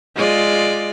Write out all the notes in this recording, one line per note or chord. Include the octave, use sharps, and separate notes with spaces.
G#3 F4 D5